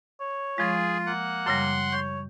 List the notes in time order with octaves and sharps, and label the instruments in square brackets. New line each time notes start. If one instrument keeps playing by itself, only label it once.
[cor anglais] C#5
[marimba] F3 G#3 [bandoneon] F4 [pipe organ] G#4
[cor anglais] A#3 [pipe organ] F#5
[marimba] F#2 C#3 G3 [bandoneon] C6
[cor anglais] C#5 [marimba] G6